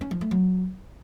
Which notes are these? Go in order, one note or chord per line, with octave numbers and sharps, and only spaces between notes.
C#4
F3
A3
F#3